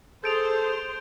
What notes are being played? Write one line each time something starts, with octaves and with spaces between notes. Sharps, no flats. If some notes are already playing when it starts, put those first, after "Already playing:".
G#4 A4 C5 G6 D7 F7